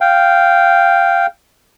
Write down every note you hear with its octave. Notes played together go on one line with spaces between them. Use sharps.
F5 G5